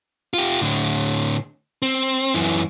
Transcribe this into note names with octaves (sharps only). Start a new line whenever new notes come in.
F4 G4
A2 D3
C4
F#2 E3